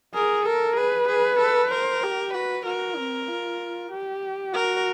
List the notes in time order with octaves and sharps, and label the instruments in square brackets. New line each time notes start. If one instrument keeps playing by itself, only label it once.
[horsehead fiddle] G#4 [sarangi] A#4
[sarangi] A4 [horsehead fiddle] A#4
[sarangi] G#4 [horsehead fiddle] B4
[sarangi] G#4
A4
[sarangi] A#4 [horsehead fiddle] C5
[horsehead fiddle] G4
[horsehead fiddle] F#4 [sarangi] B4
[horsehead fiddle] F#4 [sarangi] A#4
[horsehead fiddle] C4
F4
G4
[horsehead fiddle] F#4 [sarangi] A#4